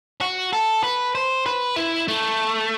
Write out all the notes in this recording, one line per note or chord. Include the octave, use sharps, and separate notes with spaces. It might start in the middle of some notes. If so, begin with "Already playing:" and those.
F#4
A4
B4
C5
B4
E4
A3